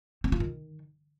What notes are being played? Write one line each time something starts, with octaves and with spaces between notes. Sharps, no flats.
C4
F4
D#3